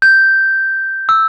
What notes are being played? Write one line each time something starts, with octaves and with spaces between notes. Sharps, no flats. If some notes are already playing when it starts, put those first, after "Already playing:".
G6
E6